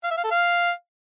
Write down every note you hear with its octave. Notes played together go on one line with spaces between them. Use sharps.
F5
E5
F5
A4
F5